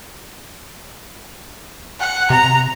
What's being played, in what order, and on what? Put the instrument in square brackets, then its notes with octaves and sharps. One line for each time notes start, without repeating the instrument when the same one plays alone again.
[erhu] F#5
[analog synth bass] C3 [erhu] A#5